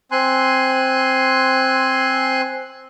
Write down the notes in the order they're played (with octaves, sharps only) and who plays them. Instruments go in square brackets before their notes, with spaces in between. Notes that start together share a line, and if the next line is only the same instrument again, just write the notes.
[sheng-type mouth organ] C4 G#5 C6 F#6